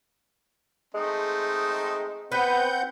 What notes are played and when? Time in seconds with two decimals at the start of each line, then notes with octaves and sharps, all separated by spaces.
0.95 G#3 A3 C4 D#4
2.32 B3 C4 B4 F#5 G6